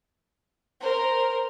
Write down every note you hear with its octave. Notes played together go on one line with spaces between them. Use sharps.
A#4 C5